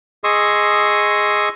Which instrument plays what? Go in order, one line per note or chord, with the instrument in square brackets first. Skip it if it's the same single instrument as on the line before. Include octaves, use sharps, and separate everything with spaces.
[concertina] G#4 D#5 C6 C#6 D#6 E6